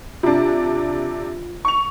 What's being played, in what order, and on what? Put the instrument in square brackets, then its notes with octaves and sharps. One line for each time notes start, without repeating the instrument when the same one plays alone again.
[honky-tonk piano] C3 D4 [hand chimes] F4
[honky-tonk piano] C#6 F7